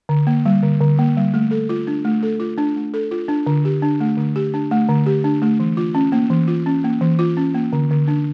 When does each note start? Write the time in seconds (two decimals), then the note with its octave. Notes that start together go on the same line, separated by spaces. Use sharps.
0.09 D3
0.27 A#3
0.46 G3
0.63 D3
0.81 D3
0.99 A#3
1.17 G3
1.34 A3
1.51 A4
1.69 F4
1.87 D4
2.05 A3
2.23 A4
2.40 F4
2.58 D4
2.76 A3
2.94 A4
3.11 F4
3.28 D4
3.47 D3
3.65 G4
3.82 D4
4.00 A3
4.17 D3
4.36 G4
4.54 D4
4.71 A3
4.88 D3
5.06 G4
5.24 D4
5.42 A3
5.60 E3
5.77 F4
5.95 C#4
6.12 A#3
6.30 E3
6.48 F4
6.66 C#4
6.84 A#3
7.01 E3
7.19 F4
7.37 C#4
7.55 A#3
7.73 D3
7.91 D3
8.08 D4